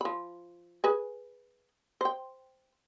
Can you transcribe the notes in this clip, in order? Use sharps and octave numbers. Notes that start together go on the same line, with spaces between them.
F3 B5
G#4 B4 G#5
C5 G5